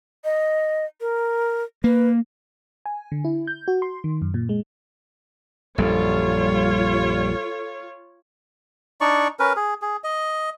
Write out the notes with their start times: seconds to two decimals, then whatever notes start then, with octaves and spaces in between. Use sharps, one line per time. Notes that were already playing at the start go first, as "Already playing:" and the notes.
0.24 D#5
1.01 A#4
1.84 A#3 B4
2.86 G#5
3.12 D3
3.25 E4
3.47 G6
3.68 F#4
3.82 C6
4.04 D#3
4.22 F#2
4.34 A#2
4.49 G#3
5.78 A#1 F#2 G3 F4 A4 C#5
9.01 D4 D#4 D5 C#6
9.39 C#4 A#4 B4
9.56 G#4
9.82 G#4
10.04 D#5